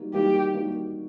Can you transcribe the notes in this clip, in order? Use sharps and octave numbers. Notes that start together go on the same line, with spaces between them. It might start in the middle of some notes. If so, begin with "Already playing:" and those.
Already playing: G3 A#3 D#4 F#4
G3 A#3 D#4 F#4 G4
G3 A#3 D#4 F#4